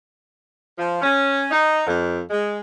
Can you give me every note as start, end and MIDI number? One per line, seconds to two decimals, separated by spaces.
0.78 1.01 53
1.02 1.46 61
1.51 1.81 63
1.87 2.21 41
2.30 2.60 56